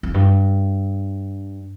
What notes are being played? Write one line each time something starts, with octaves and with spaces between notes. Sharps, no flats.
F2
G2